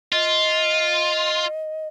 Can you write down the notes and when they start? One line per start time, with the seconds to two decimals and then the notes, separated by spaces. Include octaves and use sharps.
0.13 F4 D#5